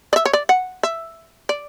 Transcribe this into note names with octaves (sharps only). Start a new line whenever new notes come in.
D5
E5
C#5
D5
F#5
E5
D5